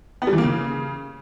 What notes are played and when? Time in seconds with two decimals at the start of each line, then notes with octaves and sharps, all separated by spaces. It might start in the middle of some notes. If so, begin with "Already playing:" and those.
0.22 B3
0.27 G3
0.33 E3
0.38 A#3
0.44 C#3